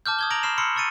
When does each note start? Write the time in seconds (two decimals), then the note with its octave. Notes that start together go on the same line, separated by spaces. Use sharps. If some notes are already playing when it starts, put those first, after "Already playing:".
0.06 A5 D6 F6 G6
0.19 D#6 G#6 G7
0.30 A#5 A#6 D7 F7 F#7
0.43 B5 C#6 F6 C7 E7
0.58 B5 C6 E6 F6 C7 C#7
0.75 C6 C#6 E6 A6 C#7 D#7